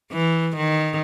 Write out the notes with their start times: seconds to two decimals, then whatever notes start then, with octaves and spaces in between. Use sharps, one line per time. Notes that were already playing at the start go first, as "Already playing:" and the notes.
0.13 E3
0.57 D#3